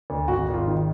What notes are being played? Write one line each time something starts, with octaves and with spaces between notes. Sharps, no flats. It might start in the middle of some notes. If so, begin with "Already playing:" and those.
D2
G#1 F#4
G#1
F4
D#3